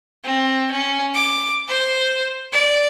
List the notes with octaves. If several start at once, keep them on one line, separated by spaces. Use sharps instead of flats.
C4
C#4
D6
C5
D5